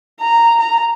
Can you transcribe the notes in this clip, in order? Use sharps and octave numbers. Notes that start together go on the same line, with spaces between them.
A#5
A#5